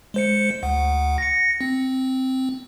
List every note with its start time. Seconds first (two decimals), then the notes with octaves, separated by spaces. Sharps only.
0.14 G#3 C5 C#7
0.63 D2 F#5
1.18 A#6 C#7
1.61 C4